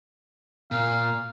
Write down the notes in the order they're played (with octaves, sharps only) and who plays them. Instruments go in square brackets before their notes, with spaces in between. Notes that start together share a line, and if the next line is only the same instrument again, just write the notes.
[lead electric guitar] A#2 [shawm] F5